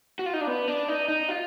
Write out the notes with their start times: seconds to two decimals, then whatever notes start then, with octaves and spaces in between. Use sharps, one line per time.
0.19 F#4
0.26 F4
0.33 D#4
0.41 D4
0.47 B3
0.68 D4
0.88 D#4
1.08 D#4
1.29 F4